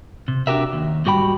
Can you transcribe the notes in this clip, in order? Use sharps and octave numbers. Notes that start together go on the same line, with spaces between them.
C3
D4 D#4 F#4 G4 A#4 E5
D#2
G#2 G3 F#4 G4 G5 B5